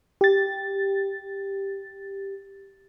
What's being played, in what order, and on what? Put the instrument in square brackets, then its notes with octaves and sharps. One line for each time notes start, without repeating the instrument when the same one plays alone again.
[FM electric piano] G4 A6